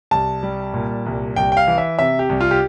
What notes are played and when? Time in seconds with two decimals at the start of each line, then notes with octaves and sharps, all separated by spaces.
0.11 C2 A5
0.43 G3
0.74 A#2
1.06 C2
1.36 C2 G5
1.52 G5
1.57 F5
1.68 E3
1.78 E5
1.99 C3 E5
2.19 G4
2.29 C2
2.41 F4
2.51 G4